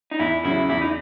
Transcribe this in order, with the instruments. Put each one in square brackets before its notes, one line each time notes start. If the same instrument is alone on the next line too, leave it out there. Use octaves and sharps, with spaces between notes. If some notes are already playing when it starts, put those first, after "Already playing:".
[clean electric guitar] D#4
[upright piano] E2 [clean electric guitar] E4
[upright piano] C#3 F#3 [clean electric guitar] E4
[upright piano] E2 [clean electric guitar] E4
[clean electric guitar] D#4